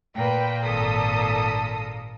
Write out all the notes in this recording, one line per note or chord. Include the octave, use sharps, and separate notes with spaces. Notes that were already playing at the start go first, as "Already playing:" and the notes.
A#2 B4 G5
G#1 A4 D#6